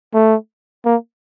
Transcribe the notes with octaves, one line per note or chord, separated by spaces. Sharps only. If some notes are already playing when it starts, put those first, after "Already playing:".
A3
A#3